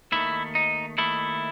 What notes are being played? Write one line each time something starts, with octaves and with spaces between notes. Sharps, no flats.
D#2 D#3 A3 E4
D#4
D#2 D#3 A3 E4